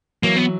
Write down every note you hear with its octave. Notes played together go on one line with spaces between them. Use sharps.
E3 F#3 A#3
B3